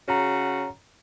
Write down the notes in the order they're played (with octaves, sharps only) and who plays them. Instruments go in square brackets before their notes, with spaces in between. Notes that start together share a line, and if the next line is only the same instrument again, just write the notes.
[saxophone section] C#3 F#4 [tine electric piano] C#5 A#5